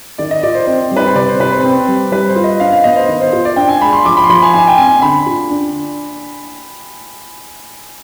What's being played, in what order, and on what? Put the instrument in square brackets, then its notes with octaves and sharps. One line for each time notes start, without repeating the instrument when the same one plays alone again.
[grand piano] D#3 [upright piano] D5
[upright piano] D#5
[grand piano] F4 [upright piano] D5
[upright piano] C5
[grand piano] C4 [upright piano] C5
[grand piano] G3
[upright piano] B4
C5
[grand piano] C3 [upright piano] D5
[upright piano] C5
[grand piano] C3 [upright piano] B4
[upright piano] C5
[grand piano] C4 [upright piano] C5
[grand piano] G3
[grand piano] G3 [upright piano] B4
[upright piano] C5
[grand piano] F4
[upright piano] D#5
[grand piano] D4 [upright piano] F5
[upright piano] F5
[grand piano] B3 [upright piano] D#5
[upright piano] C5
[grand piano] D#3
[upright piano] C5
[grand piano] F4 [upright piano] C5
[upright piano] D5
[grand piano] D4 [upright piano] G5
[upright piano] G#5
[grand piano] G#3 [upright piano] B5
[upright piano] C6
[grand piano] F3 [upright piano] D6
[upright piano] B5
C6
[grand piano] F3 [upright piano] B5
[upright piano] G#5
[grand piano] D#4 [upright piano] G#5
[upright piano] G5
[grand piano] C4 [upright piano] G#5
[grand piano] D3 [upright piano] B5
[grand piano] F4
D4